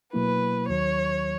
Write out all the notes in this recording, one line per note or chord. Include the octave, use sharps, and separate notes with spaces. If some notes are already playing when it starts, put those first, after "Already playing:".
B2 F#3 A#3 E4 B4
D#2 D#3 F#3 C#5